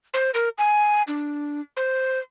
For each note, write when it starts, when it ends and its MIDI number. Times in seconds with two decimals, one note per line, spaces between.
0.14 0.31 72
0.34 0.49 70
0.58 1.03 80
1.07 1.61 62
1.77 2.19 72